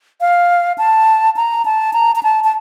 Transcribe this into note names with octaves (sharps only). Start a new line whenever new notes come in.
F5
A5
A#5
A5
A#5
A#5
A5
A5